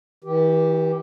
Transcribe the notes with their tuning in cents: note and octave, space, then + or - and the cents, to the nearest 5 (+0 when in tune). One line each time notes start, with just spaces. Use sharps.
E3 -35 G4 +0